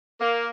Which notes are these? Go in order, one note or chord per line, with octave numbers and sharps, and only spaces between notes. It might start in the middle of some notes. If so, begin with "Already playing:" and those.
A#3